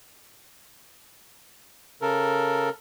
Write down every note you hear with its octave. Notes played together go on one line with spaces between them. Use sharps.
C#3 A4 A#4